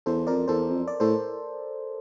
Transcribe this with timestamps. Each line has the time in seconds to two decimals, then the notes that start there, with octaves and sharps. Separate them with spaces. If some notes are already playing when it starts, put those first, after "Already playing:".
0.06 E2 A4 C5
0.27 F2 A#4 D5
0.48 E2 A4 C5
0.69 F2
0.88 D5
1.00 A2 A4 C5